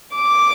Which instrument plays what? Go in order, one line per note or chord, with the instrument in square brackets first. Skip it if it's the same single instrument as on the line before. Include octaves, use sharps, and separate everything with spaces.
[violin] D6